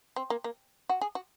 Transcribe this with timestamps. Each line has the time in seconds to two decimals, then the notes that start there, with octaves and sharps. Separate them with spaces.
0.16 C4
0.30 A#3
0.44 A#3
0.89 F#4
1.01 G#4
1.15 F#4